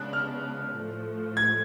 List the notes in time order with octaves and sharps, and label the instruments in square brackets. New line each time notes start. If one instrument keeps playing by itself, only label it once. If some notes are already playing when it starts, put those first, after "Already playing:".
Already playing: [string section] C#3 G#3 B3 D4 [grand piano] F#6
[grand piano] F6
[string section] A2 F3 A3
[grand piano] G#6